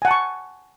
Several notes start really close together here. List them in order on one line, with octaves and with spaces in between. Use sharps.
G#5 F#5 A5 C#6